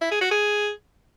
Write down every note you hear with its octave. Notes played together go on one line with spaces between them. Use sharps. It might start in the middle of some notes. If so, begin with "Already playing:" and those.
E4
G#4
F#4
G#4